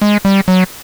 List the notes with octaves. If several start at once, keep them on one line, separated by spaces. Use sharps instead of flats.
G#3
G3
F#3